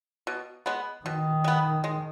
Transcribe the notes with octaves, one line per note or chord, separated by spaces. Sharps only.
B2
G#3 B3
B2 D#3
G#3 B3
G#3